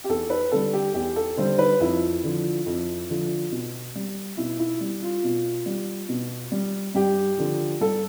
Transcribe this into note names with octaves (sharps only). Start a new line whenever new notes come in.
G4
E2 A4
B4
D3 G3 A4
G4
E2 G4
A4
D3 G3 C5
B4
F2 E4
D3 F3
F2
D3 F3
B2
G3
B2 E4
E4
G3
F4
B2
G3
B2
G3
G2 G4
D3 F3
G2 A4